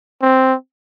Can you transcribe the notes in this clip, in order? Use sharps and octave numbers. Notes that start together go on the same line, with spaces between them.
C4